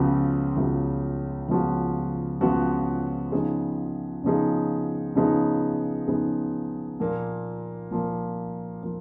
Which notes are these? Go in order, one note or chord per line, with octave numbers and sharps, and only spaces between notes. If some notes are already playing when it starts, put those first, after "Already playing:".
Already playing: C#2 C#3 F3 B3 F#4
C#2 C#3 F3 B3 F#4
C#2 C#3 F3 B3 F#4
C#2 C#3 F3 B3 F#4
C#3 F3 B3 D#4 G#4
C#3 F3 B3 D#4 G#4
C#3 F3 B3 D#4 G#4
C#3 F3 B3 D#4 G#4
A#2 F3 A#3
A#2 F3 A#3
F3 A#3